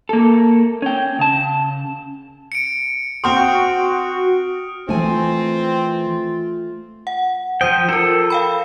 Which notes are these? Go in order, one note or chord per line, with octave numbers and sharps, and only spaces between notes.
A#3 A4
C#4 G5
C#3 A5
C#7 D7
C4 F#4 G5 C6 D#6 F6 F7
E3 A3 C4 F4 G#5
F#5
F3 C5 G5 D#6
F4 A4 A#4
F5 G5 B5